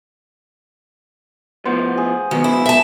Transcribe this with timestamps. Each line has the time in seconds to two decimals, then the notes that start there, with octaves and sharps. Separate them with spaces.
1.65 A2 F3 B3 C5
1.97 G#4
2.31 C#2 D#3 F#3 B3
2.44 E4
2.66 E5 A5